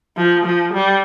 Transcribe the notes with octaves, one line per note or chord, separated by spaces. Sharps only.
F3
F3
G3